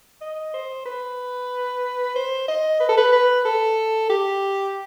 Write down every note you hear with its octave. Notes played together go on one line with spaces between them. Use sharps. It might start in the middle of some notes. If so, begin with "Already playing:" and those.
D#5
C5
B4
C5
D#5
B4
A4
B4
B4
A4
G4